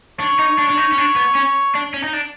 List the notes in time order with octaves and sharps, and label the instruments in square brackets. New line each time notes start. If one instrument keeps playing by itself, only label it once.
[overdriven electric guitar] D4 [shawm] C#5
[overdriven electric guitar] D#4
D4
D4
D#4
C#4
D4
B3
C#4
D4
C#4
D#4
D4